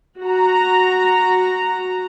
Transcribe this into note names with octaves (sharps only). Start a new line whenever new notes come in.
F#4 A#5